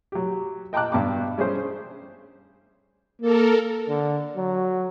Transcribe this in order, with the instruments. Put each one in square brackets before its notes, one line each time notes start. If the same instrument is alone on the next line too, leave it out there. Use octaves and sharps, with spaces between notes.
[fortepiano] F#3 G4
D#5 G5 A5 A#5 D6 F#6
G2 B2 A5 A#5 D6
G3 C#4 D4 G4 G#4 C5
[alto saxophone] A#3 [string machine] A4 A#4
[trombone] D3
F#3